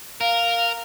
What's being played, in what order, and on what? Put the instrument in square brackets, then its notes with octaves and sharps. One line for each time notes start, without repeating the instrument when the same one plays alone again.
[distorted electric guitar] A#4 [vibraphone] F5